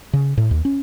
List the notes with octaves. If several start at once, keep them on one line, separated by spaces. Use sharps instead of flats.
C#3
A2
D#2
C#4